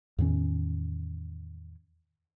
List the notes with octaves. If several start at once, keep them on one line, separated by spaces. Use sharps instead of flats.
E2 A2 D#3 C#4